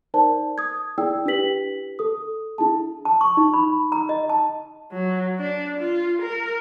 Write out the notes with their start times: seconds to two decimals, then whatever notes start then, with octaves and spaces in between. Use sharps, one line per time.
0.14 D#4 A#4 C5 D5 A5
0.58 D#6 G#6
0.98 E4 G#4 D5 G5 E6
1.26 D4 E4 G4 B4 B6 F#7
1.99 A4 D#6
2.58 D4 E4 G#4 A5
3.05 A5
3.21 C#6
3.37 D#4
3.54 B5
3.92 A#5
4.09 D#5
4.29 A5
4.92 F#3
5.39 D4
5.78 F4
6.22 A#4